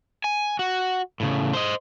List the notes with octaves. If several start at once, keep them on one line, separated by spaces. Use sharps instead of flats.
G#5
F#4
A2 C#3
C5 D#5